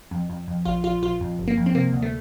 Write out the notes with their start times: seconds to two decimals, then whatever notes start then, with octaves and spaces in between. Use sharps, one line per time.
0.11 F2
0.30 F2
0.47 F2
0.65 A#1 F4
0.84 A#1 F4
1.03 A#1 F4
1.21 F2
1.39 G1
1.48 A#3
1.57 F2
1.66 C4
1.75 C3 A#3
1.93 D2
2.03 A3